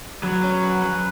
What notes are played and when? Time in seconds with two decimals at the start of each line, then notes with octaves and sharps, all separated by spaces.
0.23 F#3 B4
0.43 C#4
0.63 B4
0.82 B4